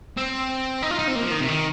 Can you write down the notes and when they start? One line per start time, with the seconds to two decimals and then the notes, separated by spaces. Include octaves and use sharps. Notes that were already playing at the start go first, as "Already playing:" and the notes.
0.17 C4
0.82 D#4
0.91 F4
0.99 D#4
1.08 C4
1.15 A#3
1.23 F3
1.31 D#3
1.40 C3
1.48 D#3